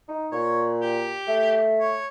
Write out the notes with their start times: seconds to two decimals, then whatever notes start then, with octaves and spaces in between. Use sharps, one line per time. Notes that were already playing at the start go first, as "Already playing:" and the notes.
0.08 D#4
0.32 A#2 C#5
0.82 G4
1.27 A3
1.80 C#5